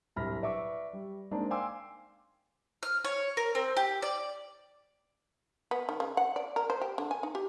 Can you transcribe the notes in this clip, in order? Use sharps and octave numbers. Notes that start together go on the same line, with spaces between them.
D1 C2 B5 F6 A#6
B4 D5 E5 C#6 D6
G3
G#3 A#3 C4 D4 D#4
F5 G5 G#5 C6 D6 E6
F6
C#5
A#4
C4
G4
D5
B3
D#3
C#3
F#5
D5
A#4
C5
G4
D3
G#5
D#4
G4